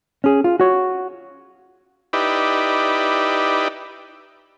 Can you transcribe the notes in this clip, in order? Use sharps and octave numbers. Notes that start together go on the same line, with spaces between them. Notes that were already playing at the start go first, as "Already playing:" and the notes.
C#4 G#4
F4
F#4 C#5
D#4 E4 G4 B4 D5